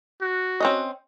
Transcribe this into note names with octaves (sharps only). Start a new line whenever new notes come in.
F#4
C4 C#4 D#5